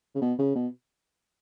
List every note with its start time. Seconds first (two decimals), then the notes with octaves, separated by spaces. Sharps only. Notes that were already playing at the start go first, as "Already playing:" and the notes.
0.15 C#3
0.22 B2
0.39 C#3
0.55 B2